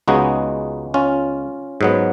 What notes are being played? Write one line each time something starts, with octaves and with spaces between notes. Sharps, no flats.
C#2 C#3 G#3 B3 D#4 F#4
C#4 F4
G#2 F#3 B3